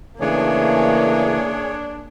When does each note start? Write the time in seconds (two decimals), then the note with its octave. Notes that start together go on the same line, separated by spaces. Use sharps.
0.20 C#3 E3 A3 A#3 D4 G#4 C#5